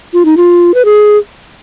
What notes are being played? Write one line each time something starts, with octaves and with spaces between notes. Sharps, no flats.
F4
D#4
F4
B4
G#4